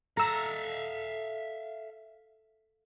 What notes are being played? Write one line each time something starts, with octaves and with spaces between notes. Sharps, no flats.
A4 E5 F5 A#5 E6